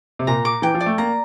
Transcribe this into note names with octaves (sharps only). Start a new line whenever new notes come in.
C3
A#2 A#5
D6
E3 G5
F3
D5
A3
A#3 A#5